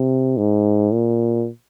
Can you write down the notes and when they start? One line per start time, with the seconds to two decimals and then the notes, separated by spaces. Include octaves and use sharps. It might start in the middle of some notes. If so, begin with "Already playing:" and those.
Already playing: C3
0.37 G#2
0.91 A#2